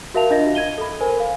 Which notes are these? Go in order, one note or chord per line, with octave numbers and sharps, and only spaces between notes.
F#4 A#4 E5 F5 A5 F7
D4 F4 D#5 A#6
G#6 D#7 G7
A4 B5
A#4 C5 G#5
F5